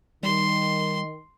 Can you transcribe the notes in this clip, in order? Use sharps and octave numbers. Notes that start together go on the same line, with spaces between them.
D#3 G3 C6